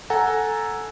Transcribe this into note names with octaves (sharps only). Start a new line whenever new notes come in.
A4 F#5 G#5 A#5